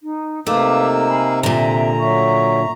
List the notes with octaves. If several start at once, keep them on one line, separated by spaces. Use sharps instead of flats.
D#4
C3 A3 A#3 D#4 B4 F5 D6 E6
F5 G#5 B5
A#2 D3 E5 A#5
F#3 E5 C#6